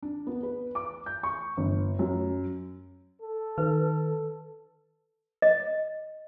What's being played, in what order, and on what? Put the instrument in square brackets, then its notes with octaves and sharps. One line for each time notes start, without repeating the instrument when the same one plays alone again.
[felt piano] D4
B3
B4
D6
G6
C#6
G1
F#2
[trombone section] A4
[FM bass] D#3 [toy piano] B4
[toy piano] D#5